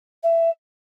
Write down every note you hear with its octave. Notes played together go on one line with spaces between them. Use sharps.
E5